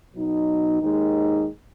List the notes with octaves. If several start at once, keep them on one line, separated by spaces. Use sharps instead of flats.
B2 F#3 D#4
D#2 D#3 G#3 D#4